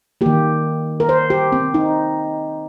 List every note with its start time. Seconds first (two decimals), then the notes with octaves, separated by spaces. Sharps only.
0.21 D#3 A#3 G4
1.00 A#4
1.09 C5
1.30 G4
1.52 C4
1.74 D#4